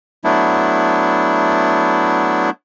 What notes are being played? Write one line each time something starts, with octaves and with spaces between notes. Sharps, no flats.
F#3 A3 B3 D4 E4